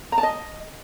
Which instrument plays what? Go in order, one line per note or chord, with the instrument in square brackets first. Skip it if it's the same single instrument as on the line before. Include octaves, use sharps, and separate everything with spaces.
[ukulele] A#5
A5
D#5